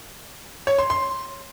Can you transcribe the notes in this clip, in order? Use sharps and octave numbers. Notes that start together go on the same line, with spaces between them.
C#5
C6
C6